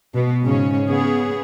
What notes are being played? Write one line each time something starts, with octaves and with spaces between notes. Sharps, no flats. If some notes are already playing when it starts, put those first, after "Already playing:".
B2 B3
G#2 C#3 C#4
C#3 B3 G#4